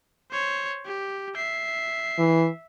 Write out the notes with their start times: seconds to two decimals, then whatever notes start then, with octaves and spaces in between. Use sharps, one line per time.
0.32 C5 C#5
0.86 G4
1.36 E5 C7
2.19 E3